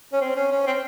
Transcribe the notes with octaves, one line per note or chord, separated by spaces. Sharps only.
C#4
C4
C#4
C#4
C4